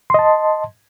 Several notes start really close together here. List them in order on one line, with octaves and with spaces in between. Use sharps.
C6 D#5 A5